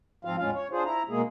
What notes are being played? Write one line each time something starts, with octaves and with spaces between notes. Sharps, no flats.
G#2 F3 C4 F4 F5
E2 A2 G#3 C#4 F4 F5
C#5
D4 F4 G#4 C5
E4 A#5
B2 G#3 A#3 G#4